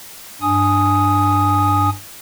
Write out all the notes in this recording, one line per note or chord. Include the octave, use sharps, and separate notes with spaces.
G2 D4 G#5 D#6